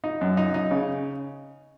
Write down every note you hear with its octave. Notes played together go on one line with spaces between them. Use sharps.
D#4
F#2
D#4
D#4
C#3